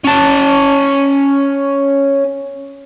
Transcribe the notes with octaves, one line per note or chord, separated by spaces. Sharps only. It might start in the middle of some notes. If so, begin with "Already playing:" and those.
C#4 A5